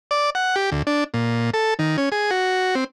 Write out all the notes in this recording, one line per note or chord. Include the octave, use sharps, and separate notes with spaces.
D5
F#5
G4
D2
D4
A#2
A4
D#3
C#4
G#4
F#4
C4